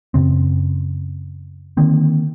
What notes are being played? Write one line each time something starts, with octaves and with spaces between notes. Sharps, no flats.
F#2 C#3 C4
D3 D#3 A#3 C4